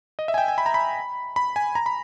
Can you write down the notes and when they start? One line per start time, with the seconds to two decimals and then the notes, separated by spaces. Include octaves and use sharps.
0.19 D#5
0.28 E5
0.34 G#5
0.38 G5
0.48 G#5
0.58 B5
0.66 A#5
0.74 B5
1.36 B5
1.56 G#5
1.75 A#5
1.86 B5